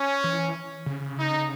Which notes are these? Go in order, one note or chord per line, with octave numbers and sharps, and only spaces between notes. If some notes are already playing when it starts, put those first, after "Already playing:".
Already playing: C#4
E3
C#3
D#4